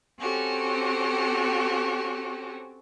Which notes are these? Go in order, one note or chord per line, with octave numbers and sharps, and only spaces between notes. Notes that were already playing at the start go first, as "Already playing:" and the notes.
C4 C#4 F#4 G4 A4